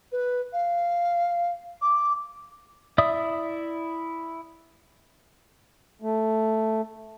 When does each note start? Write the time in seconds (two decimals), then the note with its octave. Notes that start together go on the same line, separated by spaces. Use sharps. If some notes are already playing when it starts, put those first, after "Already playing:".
0.11 B4
0.52 F5
1.81 D6
2.98 E4 D5 E5 D#6
6.02 A3